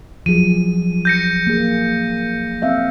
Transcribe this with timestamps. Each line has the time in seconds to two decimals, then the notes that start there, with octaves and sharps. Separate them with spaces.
0.26 F3 F#3 G#4 D#7
1.05 G6 A#6 C#7
1.47 A#3 G#4
2.62 C4 E5 F5